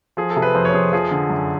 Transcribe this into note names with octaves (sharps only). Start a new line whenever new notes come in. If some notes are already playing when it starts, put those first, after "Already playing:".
F3 G#4
A4
C3
B4
F2 C5
C#5
F2 G#4
F3 G#4
D3
F#2